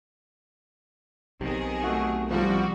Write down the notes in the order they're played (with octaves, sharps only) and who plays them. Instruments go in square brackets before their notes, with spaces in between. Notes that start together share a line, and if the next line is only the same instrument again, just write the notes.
[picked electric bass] B1 C3 [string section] D#3 G#4
[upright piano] A3 F#4
[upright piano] C2 F3 [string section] G3 F#4